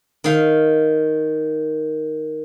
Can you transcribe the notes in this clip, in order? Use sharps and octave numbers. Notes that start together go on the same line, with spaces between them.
D#3 F5